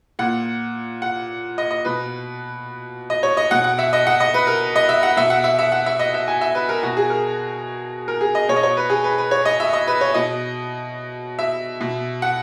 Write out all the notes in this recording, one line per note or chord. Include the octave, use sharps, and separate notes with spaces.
A#2 F#5
F#5
D#5
D#5
B2 B4
D#5
C#5
D#5
B2 F#5
F#5
E5
D#5
F#5
D#5
B4
A#4
D#5
E5
F#5
B2 E5
F#5
E5
E5
F#5
E5
D#5
E5
G#5
E5
B4
A#4
B2 F#4
G#4
A#4
A#4
G#4
D#5
B2 C#5
D#5
C#5
B4
G#4
B4
B4
C#5
D#5
E5
D#5
B4
C#5
B2 D#5
E5
B2
F#5